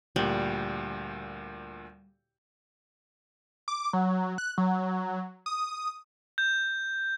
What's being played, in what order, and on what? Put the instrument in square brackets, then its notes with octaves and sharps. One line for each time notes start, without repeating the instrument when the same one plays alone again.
[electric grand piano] D2 A#2 [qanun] G3
[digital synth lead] D6
F#3
F#6
F#3
D#6
[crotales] G6